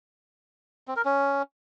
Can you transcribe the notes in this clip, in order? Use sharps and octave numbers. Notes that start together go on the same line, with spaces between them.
C4
A#4
C#4